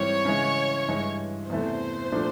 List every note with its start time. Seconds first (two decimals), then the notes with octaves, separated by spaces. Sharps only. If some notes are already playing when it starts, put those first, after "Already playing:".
Already playing: G#2 E3 G3 C4 C#5
0.25 C#3 E3 G#3
0.88 G2 E3 G#3
1.50 E2 C3 E3 A3 C5
2.12 A#2 F3 A3 D4